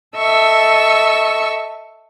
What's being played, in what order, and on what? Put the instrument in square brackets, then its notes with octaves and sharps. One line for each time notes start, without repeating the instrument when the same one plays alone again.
[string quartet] A4 D#5 E5 C#6 E6